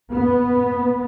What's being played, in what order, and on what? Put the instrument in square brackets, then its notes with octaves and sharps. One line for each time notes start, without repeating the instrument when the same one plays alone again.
[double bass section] B3